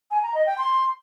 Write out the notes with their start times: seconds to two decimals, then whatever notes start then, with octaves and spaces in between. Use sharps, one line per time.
0.11 G#5
0.23 A#5
0.34 D#5
0.46 G5
0.58 C6